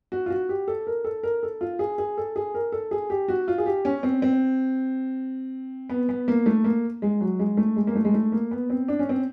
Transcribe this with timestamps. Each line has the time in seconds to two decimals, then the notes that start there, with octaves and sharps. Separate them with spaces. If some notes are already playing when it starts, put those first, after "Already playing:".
0.12 F#4
0.26 F4
0.30 F#4
0.49 G4
0.68 A4
0.87 A#4
1.05 A4
1.23 A#4
1.43 A4
1.61 F4
1.79 G#4
1.98 G#4
2.18 A4
2.36 G#4
2.55 A#4
2.72 A4
2.91 G#4
3.10 G4
3.28 F#4
3.48 F4
3.58 G#4
3.66 G4
3.85 C#4
4.03 C4
4.22 C4
5.89 B3
6.09 B3
6.28 A#3
6.46 A3
6.64 A#3
7.02 G#3
7.21 F#3
7.39 G#3
7.57 A3
7.76 G#3
7.87 A#3
7.95 A3
8.05 G#3
8.14 A3
8.32 A#3
8.51 B3
8.70 C4
8.88 D4
8.99 C#4
9.09 C4